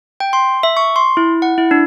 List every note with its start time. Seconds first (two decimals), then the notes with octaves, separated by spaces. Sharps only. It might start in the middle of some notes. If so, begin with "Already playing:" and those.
0.20 G5
0.33 C6
0.63 E5
0.77 C#6
0.96 C6
1.17 E4
1.42 F#5
1.58 E4
1.71 D4